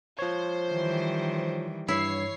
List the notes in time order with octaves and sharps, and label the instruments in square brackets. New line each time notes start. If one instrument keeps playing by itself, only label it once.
[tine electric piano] F3 C#5 [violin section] C5
[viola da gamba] D#3 E3 G3
[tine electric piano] G2 [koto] E4 [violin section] C#5 C7